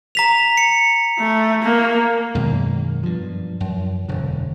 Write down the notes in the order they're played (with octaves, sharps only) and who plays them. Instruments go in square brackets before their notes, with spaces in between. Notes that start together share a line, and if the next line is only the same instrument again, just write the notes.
[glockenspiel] A#5 B6 F7
C#7
[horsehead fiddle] A3
A#3
[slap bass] F#2 B2 D#3 G#3
G2 F3
F#2
E1 D3